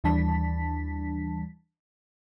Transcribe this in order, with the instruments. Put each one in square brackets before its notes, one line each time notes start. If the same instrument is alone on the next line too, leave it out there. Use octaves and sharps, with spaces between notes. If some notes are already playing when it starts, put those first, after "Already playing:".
[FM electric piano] D#2 E3 G3 D4 A5 B6